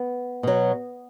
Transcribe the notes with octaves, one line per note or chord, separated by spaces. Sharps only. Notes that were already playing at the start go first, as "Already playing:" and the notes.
Already playing: B3
B2 F#3